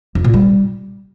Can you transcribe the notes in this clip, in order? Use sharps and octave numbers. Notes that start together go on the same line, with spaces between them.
F2
A#2
G3